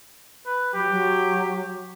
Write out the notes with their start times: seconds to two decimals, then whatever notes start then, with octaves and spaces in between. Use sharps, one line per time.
0.46 B4
0.74 F#3 G4
0.91 F#3